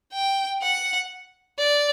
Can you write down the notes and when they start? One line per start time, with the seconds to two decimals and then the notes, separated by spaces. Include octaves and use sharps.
0.13 G5
0.62 F#5
1.58 D5